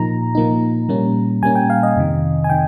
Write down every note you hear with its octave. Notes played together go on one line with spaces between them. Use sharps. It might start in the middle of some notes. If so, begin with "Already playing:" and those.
Already playing: A#2 F3 A#3 D#4 A#5
A#2 F3 A#3 D#4
A#2 G3 A#3 C#4
A#2 G3 A#3 C#4 G#5
G5
F5
D#5
F2 C3 D#3
G#5
C3 D#3 G5